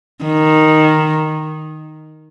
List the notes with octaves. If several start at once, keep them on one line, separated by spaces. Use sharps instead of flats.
D#3